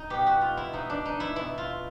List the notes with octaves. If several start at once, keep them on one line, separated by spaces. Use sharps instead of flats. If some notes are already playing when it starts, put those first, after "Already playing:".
Already playing: D#4
B2 G4
F#4
F4
E4
B2 D#4
D4
D#4
E4
B2 E4
F4